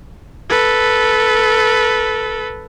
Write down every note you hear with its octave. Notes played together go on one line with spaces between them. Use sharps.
A4 B4